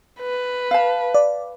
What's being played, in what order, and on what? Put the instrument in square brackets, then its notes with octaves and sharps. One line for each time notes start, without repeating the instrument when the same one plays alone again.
[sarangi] B4
[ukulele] F5 A5
[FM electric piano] D5